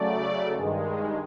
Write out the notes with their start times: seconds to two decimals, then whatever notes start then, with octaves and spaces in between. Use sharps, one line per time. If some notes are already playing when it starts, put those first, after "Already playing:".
Already playing: C#3 F#3 A3 D5
0.53 G2 D#3 G#3